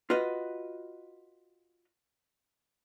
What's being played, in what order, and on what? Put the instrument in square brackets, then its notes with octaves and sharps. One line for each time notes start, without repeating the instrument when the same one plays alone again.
[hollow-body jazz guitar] F4 F#4 B4 D#5